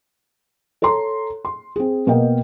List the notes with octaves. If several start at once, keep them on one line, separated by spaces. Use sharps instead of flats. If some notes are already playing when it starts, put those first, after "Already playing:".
A4 C#5 A#5 C6
C6
C4 G#4
B2 A#3 A#4 D#5 G5